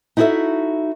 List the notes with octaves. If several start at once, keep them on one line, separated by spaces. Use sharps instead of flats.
D#4 E4 F#4 G4 A4 E5